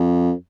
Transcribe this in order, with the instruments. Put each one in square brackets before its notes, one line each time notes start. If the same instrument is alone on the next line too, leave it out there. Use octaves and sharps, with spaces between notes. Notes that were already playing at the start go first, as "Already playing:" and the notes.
Already playing: [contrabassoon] F2